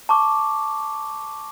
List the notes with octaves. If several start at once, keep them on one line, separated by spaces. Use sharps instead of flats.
A5 C#6 D6